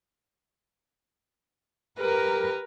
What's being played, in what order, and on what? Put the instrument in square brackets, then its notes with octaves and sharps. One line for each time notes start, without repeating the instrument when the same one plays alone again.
[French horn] G4 [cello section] A#4 [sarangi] B4